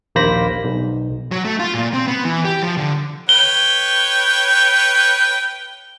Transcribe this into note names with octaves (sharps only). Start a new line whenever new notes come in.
A#1 D#2 A#3 C5 B5 A#6
B1
F#3
A3
F4
A#2
C4
B3
E3
G4
F3
D3
B4 C#5 G5 G7